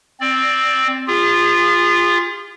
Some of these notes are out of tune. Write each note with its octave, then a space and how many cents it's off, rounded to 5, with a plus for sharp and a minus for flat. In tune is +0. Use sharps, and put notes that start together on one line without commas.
C4 +5 D5 +0
F4 +0 G#4 -35